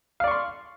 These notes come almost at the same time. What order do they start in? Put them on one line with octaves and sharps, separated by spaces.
F5 D5 C#6 C6